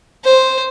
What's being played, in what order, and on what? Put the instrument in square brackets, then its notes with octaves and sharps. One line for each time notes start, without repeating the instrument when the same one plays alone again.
[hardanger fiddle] C5